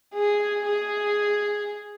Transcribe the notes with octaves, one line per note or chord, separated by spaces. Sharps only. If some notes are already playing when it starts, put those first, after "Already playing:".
G#4
G#4